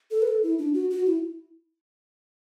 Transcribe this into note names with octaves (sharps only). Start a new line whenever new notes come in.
A4
B4
A4
E4
D4
F#4
F#4
E4